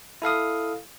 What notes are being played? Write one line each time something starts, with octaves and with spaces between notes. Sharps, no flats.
E4 A4 F5 D#6